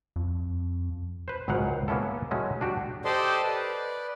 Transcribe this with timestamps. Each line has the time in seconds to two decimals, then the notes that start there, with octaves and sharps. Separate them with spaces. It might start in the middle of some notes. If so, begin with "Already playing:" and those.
0.16 F2
1.28 B4 C5
1.48 G#1 C#2 G#2 F#3 F5 F#5
1.88 A#3 B3 C#4 E4 A4
2.31 F#3 G#3 A3 C#4 F#4
2.61 D4 F#4 G4
3.05 G4 A4 C5 D5 D#5 C6
3.44 B4 D5